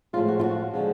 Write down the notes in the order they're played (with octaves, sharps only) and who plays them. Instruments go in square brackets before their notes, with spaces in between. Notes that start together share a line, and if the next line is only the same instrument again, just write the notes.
[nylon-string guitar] A2 F3 G#3 F4
F#4
F4
F#4
D3 F3 G#3